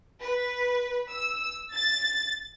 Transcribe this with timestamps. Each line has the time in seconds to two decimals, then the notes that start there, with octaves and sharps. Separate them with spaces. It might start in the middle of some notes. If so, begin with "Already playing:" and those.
0.22 B4
1.12 E6
1.72 A6